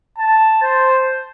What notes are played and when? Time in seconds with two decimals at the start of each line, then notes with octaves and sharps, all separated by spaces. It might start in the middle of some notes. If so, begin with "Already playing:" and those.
0.18 A5
0.62 C5